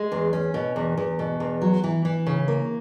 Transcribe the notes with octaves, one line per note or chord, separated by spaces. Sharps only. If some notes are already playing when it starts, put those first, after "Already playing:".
Already playing: G#3
E2
C#4
B2
E2
E2
B2
E2
F#3
E3
E3
C#3
A#3